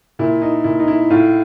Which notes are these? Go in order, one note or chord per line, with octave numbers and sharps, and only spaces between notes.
A#2 E4
D#4
A#2 E4
D#4
E4
A2 F4